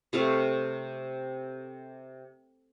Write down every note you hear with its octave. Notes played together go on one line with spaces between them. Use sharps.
C3 A3 F5